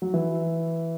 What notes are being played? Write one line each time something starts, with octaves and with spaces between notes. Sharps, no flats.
F#3
E3